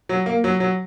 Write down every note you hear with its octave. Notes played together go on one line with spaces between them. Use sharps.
F#3
A#3
F#3
F#3